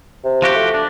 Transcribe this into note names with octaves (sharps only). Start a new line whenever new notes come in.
C3
F3 F#4 G4
A3
D4